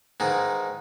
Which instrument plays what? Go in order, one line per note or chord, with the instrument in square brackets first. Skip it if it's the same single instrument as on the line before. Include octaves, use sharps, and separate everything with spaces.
[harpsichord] G#2 D#3 E3